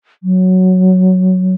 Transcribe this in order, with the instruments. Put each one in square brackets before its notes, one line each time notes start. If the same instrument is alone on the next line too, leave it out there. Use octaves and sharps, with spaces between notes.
[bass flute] F#3